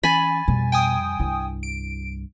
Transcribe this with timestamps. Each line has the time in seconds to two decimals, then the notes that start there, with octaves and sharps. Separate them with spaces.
0.03 E3 C#4 G#5 B5 A6
0.48 F2 B2 G3
0.72 G5 G#5 D#6
1.20 C2 G2 E4
1.63 D7